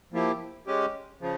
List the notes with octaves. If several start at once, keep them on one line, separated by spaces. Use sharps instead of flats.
F3 A#3 E4 G4
G#3 C#4 G4
C#3 F3